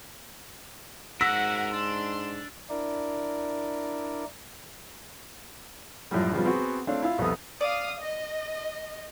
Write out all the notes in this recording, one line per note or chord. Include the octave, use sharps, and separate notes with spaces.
G#2 F#4 A#4 F#5 E6 A#6 B6
D4 C6
D4 E4 A#4 D5
F#2 A2 F3 G3
C#3 F3 G3 B3
B3 C4 F#4 G#4
A3 C4 D4 C#5 F5
E4 F4 F5 E6
C2 F2 B3 A4 D#6
D5 F5 D#6
D#5